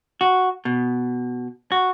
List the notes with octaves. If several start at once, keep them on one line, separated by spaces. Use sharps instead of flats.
F#4
B2
F#4